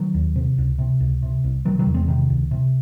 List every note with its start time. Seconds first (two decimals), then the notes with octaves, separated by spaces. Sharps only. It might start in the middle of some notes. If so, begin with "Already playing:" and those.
Already playing: D#3 F#3
0.14 D#2
0.36 C3
0.58 C#2
0.78 C3
1.00 C#2
1.23 C3
1.44 C2
1.65 C3 D#3 F#3
1.79 D#3 F#3
1.86 E2
1.94 G#3 C4
2.08 C3 D#3
2.30 C#2
2.51 C3